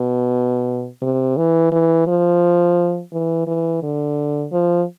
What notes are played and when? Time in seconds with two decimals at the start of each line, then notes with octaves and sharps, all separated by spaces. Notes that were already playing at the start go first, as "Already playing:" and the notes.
Already playing: B2
1.02 C3
1.37 E3
1.71 E3
2.07 F3
3.12 E3
3.47 E3
3.82 D3
4.52 F3